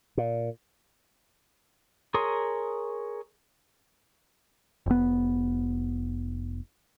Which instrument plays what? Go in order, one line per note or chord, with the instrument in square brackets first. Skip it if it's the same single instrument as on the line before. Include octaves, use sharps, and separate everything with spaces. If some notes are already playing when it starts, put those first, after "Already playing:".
[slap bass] A#2
[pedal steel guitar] G#4 A#4 C#5 C6 D#6
[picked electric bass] F1 B3